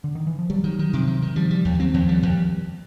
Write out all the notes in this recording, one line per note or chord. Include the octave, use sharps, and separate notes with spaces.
D3
D#3
E3
F3
F#3 G3
D#3
D#3
C3
D#3
D#3
F3 G3
G3
D#2
F#3 C4
D#2 F3
G3
D#2